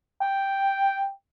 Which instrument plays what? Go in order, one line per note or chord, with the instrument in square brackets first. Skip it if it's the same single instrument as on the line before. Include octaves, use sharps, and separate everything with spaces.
[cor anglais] G5